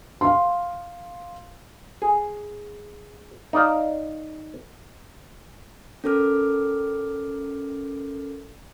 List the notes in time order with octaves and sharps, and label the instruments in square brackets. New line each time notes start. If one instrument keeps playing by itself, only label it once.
[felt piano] F5 C6
[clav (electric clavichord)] G#4
D#4 D5 F5
[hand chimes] C#4 A4 A#4 D6 F6